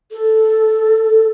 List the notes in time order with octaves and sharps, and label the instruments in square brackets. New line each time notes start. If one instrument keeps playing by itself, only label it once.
[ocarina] A4